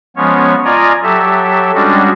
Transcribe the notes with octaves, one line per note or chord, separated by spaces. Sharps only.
F3 G#3 B3 C#4 C#5
F4 D5 D#5 G#5 A#5
F#3 G4 A4 E5
G3 G#3 C#4 D4 F#4